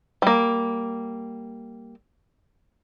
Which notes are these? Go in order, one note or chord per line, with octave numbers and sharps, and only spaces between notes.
G3 A#3